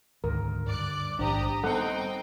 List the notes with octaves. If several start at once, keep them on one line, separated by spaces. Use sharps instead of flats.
D2 G#2 D#3 A#4
G2 D3 D5 D6 F#6
A#1 G#2 D#3 D4 G4 C5 A#5 D#6
G3 B3 C4 D#4 A4 F#5 G5